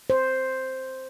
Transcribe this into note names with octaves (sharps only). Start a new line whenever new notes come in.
C5